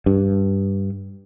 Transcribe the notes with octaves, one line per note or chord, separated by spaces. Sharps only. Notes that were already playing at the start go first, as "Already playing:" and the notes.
G2